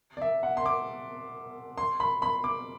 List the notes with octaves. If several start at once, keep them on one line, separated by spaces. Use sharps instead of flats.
D5
E5
F#5
C6
D6
C6
B5
B5
D6